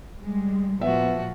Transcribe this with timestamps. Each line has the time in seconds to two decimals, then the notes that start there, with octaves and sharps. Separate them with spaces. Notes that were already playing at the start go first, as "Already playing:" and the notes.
0.20 G3 G#3
0.81 A#2 F3 B3 F#4 E5